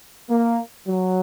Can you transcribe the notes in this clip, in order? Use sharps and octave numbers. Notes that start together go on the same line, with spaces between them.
A#3
F#3